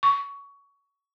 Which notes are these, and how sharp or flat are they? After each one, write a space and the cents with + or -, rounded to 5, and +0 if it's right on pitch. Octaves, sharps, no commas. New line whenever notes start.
C#6 +20